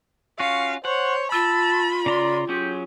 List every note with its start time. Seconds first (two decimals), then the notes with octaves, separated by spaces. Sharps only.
0.40 C#4 F4 F#4 F5
0.85 C5 C#5 F#5
1.32 F4 A5 B5 E6
2.06 C#3 D5 A#5 C6
2.49 F#3 C#4 G4 G#4